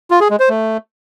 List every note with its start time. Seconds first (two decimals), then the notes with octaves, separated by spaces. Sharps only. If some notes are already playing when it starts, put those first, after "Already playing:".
0.11 F4
0.20 G#4
0.30 G#3
0.40 C5
0.49 A3